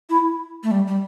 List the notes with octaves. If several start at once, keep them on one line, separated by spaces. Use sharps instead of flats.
E4
A3
G3
G3